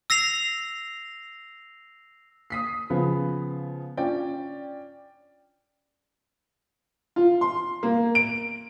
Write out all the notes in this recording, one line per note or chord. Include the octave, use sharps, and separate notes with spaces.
E6 A#6 C7 F7
D#6 B6 C7
C#3 F3 B3
C#4 D4 F4 D5 G5
F4
C6
A#3
D7